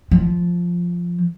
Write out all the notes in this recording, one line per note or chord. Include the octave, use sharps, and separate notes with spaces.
F3